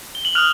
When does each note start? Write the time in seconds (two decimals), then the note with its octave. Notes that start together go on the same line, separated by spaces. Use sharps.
0.15 G7
0.25 F#7
0.35 D#6 F6 F#6 F7